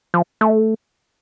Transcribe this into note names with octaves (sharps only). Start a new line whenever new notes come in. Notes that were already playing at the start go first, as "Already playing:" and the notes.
F3
A3